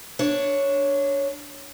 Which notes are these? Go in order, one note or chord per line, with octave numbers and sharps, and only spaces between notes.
D4 C#5